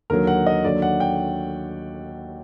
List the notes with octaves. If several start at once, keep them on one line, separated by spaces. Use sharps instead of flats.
D#2 D3 F#3 A#4
F#5
D#5
D#2 D3 F#3 D5
F#5
G5